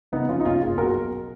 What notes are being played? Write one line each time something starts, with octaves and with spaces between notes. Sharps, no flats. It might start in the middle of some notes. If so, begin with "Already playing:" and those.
C#3 B3 D#4
F2 C#4 F4
D#4
F#1 C#4 F4
F#1 F4 G#4
B1 F#4 A#4